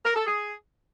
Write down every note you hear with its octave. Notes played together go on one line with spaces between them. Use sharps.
A#4
A4
G#4